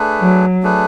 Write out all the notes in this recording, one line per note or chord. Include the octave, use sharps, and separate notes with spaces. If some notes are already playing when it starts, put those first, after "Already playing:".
Already playing: A3 D4 G#4 B4
F#3
A3 D4 G#4 B4